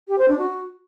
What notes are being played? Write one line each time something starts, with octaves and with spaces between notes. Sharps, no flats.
G4
C5
D4
F#4